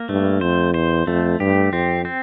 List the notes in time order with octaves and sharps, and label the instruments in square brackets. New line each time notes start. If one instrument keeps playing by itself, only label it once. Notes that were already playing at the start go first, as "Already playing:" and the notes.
Already playing: [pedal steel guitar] A#3
[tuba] G2 [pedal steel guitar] A3
[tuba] F2 [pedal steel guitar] C5
[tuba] E2 [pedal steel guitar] C5
[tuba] F2 [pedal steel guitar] A3
[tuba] G2 [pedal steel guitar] G4
[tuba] F2 [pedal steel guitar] C4
[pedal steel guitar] C4